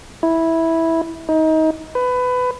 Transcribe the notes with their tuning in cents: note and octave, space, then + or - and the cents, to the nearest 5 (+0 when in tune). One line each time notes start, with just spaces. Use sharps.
E4 -10
D#4 +25
B4 +20